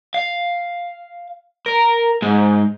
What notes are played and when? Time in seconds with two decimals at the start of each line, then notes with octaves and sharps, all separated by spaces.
0.14 F5
1.66 A#4
2.22 G#2